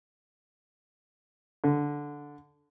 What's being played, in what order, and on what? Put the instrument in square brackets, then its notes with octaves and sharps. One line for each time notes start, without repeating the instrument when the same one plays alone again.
[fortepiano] D3